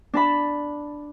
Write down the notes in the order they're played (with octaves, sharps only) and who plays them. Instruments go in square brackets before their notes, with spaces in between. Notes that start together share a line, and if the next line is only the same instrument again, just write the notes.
[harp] D4 A5 B5